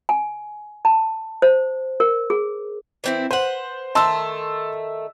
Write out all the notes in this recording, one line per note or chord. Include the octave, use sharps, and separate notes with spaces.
G#5
A5
C5
A#4
G#4
E3 C4 E4
B4 C5 F#5
D#3 A3 A5 C6 E6